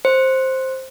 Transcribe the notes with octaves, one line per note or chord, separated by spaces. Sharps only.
C5